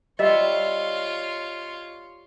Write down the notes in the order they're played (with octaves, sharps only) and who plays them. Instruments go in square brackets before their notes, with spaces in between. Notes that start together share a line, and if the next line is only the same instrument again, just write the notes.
[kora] G3 E5 [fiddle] F4 C#5 [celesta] D#5